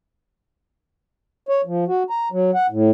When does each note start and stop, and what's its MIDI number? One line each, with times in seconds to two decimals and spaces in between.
1.49 1.61 73
1.65 1.84 53
1.88 2.03 66
2.10 2.28 82
2.32 2.51 54
2.54 2.66 78
2.70 2.91 45